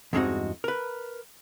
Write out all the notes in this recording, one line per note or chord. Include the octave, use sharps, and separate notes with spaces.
E2 G2 G#3 C4 D#4 F#4
A#4 B4